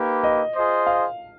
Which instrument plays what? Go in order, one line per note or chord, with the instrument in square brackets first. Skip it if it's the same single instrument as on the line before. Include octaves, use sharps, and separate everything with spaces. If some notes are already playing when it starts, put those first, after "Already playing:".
Already playing: [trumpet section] A#3 D#4 G4 B4
[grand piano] D#5
[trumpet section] F4 G#4 C5 D#5
[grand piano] F5